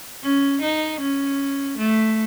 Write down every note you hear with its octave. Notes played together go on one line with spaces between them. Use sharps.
C#4
D#4
C#4
A3